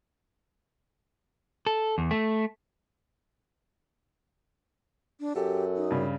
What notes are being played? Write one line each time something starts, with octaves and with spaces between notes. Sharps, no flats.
A4
E2
A3
D4
F#2 G4 A4
D#4
G2 C#3